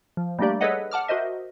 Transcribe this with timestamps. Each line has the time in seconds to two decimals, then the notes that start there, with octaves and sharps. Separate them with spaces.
0.17 F3
0.39 G3 A3 A#3 D4 G4 D5
0.61 G#4 A4 B4 C#5 D#5 F#5
0.91 F#5 A5 D6 F6
1.08 F#4 A#4 C5 D#5 E5